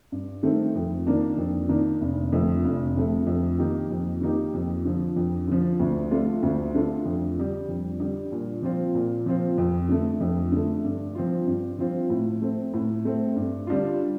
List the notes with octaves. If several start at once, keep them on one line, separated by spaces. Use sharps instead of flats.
G2
D#3 A3 C4
F2
D#3 A#3 D4
F2
D#3 A#3 D4
F1
F2 D3 A3
F1
F2 D3 A3
F2
D#3 A#3 D#4 G4
F2
D#3 A#3 D#4 G4
F2
D3 F3
F2
D3 F3
D2
D3 A3 D4 F4
D2
D3 A3 D4 F4
F2
D3 G3
F2
D3 G3
A#2
F3 C4 F4
A#2
F3 C4 F4
F2
D3 A3
F2
D3 A3
G2
F3 C4 F4
G2
F3 C4 F4
A2
A3 C4
A2
A3 C4
G2
D3 G3 D4 F4